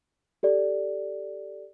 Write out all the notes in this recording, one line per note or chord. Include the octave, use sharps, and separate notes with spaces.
G4 A4 D5